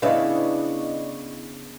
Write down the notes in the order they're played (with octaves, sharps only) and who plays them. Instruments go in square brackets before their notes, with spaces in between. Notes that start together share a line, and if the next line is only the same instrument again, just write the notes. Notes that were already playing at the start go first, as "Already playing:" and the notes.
[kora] C#3 [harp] B3 D4 [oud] E4 B4 [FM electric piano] D5 D#5 C#6